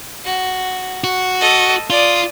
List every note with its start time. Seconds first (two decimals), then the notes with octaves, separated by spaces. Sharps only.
0.25 F#4
1.04 F#4
1.40 A4 D#5
1.90 F4 D5 D#6